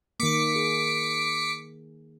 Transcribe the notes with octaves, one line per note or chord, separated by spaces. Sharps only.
D#3 A#3 D6 B6 C#7
G#4